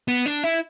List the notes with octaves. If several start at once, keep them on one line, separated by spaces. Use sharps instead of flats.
B3
D4
E4